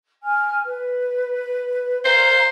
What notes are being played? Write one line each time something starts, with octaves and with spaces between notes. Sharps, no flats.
G#5 F6
B4
C5 F5 A#5 C6